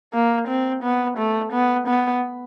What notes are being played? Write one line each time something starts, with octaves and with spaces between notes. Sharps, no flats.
A#3
C4
B3
A3
B3
B3